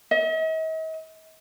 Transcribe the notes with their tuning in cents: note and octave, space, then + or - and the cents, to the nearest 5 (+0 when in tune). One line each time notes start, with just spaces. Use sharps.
D#5 +45